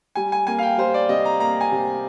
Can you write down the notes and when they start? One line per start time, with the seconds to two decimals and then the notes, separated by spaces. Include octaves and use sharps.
0.15 G3 G#5
0.32 G#5
0.47 A#3 G#5
0.59 F5
0.62 G5
0.78 G3 C5
0.94 D5
1.09 C3 D#5
1.25 A#5
1.40 A#3 A#5
1.61 G#5
1.72 C3